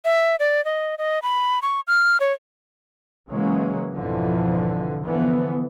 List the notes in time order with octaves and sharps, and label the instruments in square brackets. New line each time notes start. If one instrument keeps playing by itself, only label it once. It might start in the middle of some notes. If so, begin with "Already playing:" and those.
[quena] E5
D5
D#5
D#5
B5
C#6
F6
C#5
[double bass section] C#3 E3 F#3 G#3 A#3 C#4
G#1 F2 B2 D3 E3 F3
D3 E3 F3 B3